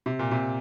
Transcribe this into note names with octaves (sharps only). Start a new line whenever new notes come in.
C3
A#2
C3